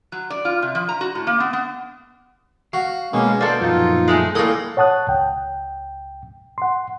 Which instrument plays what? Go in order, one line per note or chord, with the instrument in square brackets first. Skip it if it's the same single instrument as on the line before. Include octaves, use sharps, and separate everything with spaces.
[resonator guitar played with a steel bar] F#3
D5
F4
C3
F3
A#5
F#4
A2
A#3
B3
B3
[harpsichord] F#4 [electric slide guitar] F5
[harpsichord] B2 [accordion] G#3 A#3 C#4
[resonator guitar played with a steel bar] A#3 A4 [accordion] C5 D5
[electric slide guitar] F#2 A#2 F3 [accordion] D#4 F4
[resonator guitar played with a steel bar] G#3 A3 G#4
[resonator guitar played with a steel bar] A2 A#3 [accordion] G3 [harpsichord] G#4 A4
[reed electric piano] C#5 F#5 A5 D#6 F#6
C#2 G5
F#5 C6